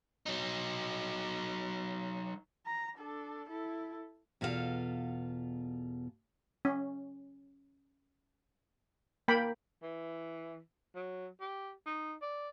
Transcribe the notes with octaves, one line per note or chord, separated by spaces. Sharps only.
F#3 D#4
A#5
D4 A4
E4 A4
E2 B2 F4 F#4 A4 F5
C#4
A#3 G5 B5
E3
F#3
G4
D#4
D5